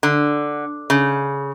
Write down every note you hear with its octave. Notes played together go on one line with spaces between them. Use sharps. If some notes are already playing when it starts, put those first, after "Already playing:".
D3
C#3